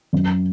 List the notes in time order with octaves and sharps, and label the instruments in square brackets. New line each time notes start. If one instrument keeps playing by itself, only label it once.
[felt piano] F#2